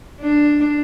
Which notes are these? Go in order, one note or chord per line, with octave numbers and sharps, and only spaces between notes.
D4